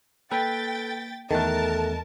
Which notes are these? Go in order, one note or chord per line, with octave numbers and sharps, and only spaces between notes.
A#3 A4 B4 G5 A6 B6
E2 D#3 A3 A4 A#4 A5 F#6